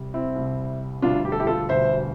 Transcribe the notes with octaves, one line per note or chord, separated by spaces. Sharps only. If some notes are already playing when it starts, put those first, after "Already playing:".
Already playing: C2 C3 G3
C4 E4
C2 C3 G3
E1 D2 D3 G3 D4 F4
G4
A4
E4 G4
F4 A4
E1 D2 D3 G3 C5 E5